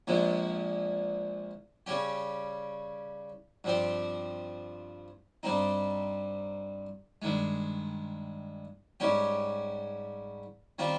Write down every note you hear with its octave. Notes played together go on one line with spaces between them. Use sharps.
A#1 A#2 F3 G#3
C#3 G3 C#4 G4
G2 F3 C4 G4
G2 G3 C4 D#4
G2 D#3 G#3
G#2 G3 C#4 G4
D#3 G3 C4 F4